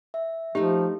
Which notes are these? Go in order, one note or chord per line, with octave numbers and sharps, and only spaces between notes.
E5
F3 A3 D#4 G4